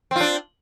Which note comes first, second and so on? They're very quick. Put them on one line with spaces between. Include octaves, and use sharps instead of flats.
C4 F4 D4